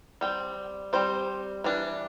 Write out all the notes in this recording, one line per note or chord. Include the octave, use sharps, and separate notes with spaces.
G3 C4 G5
G3 C4 C5
E3 G3 D4